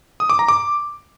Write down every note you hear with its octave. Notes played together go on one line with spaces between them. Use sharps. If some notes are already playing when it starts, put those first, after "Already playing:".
D#6
D6
A#5
D6